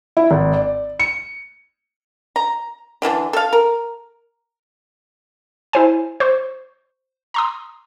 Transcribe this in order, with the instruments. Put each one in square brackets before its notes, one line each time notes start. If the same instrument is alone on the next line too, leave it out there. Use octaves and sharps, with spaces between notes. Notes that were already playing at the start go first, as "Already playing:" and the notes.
[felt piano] E4
G#1
D5
C#7
[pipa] A#5
D3 E3 A#3 D4
A4 F5
A#4
[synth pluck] E4 C5 G#5
C5 C#6
A#5 C6 D#6